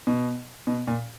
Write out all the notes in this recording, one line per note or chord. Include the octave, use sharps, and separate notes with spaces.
B2
B2
A#2